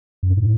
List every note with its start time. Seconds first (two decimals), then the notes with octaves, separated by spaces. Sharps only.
0.23 F#2
0.37 A2